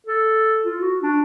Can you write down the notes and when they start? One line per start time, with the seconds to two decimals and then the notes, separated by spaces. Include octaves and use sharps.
0.07 A4
0.65 F4
0.81 F#4
1.02 D4